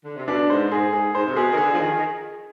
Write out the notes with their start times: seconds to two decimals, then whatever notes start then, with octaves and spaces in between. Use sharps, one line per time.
0.05 D3
0.16 C3
0.28 B2 D4
0.50 G#2 C5
0.70 G#2 G#4
0.92 G#2 G#4
1.15 G#2 C5
1.26 C3
1.36 B2 G#4
1.52 D#3
1.57 D3 G#4
1.73 F3
1.79 D#3 G#4
1.96 D#3